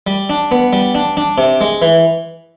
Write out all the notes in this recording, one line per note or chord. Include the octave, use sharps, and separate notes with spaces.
G3
D4
B3
G3
D4
D4
C3
G#3
E3